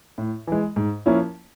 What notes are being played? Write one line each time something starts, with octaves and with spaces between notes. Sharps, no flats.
A2
E3 G#3
G#2
F3 A#3 C#4 E4